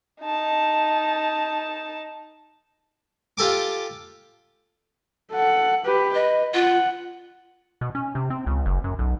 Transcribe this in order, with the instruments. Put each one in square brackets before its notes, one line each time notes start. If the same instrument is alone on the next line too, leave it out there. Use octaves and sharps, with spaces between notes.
[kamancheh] D#4 A5
[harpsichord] F4 G4 A4 G#5 D6
[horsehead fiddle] A4 F#5
G4 B4
[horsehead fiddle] B4 [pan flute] D#5
[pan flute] F4 [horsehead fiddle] F#5
[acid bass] B2
C#4
C3
C4
C#2
F#1
F#2
B1